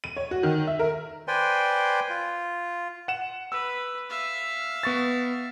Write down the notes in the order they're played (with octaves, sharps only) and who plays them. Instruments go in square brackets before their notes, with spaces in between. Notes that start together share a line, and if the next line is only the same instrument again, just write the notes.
[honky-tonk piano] D#7
C#5
F#4
D#3
E5
A#4
[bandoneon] B4 C5 D5 G5 G#5 C6
F4
[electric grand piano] F#5 E7
[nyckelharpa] B4 [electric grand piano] E6
[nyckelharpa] E5 F5
[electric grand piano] B3 C#6 A6